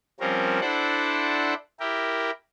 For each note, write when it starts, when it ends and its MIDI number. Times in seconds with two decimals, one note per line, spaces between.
0.20 0.60 53
0.20 0.60 55
0.20 0.60 60
0.20 0.60 61
0.20 0.60 70
0.61 1.54 62
0.61 1.54 64
0.61 1.54 69
0.61 1.54 72
0.61 1.54 74
0.61 1.54 78
1.80 2.31 64
1.80 2.31 67
1.80 2.31 70